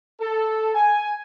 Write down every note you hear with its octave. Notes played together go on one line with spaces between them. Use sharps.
A4
G#5